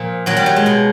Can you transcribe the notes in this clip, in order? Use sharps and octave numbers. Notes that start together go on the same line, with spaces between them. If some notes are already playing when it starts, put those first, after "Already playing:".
Already playing: A#2 F3
A#2 F#3
G3
F#3
G#3
B2